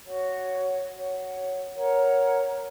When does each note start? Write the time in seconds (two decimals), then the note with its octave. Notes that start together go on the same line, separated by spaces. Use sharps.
0.05 F#4 C#5 F#5
0.90 F#4 C#5 F#5
1.75 A#4 C#5 F#5 A#5